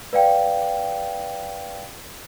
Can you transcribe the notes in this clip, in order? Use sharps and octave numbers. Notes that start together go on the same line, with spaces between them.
B4 D5 F5 G5